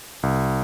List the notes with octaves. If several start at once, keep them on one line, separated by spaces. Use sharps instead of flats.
C2